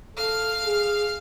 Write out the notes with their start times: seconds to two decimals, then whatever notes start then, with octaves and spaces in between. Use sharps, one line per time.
0.17 A4 F5 F6
0.65 G#4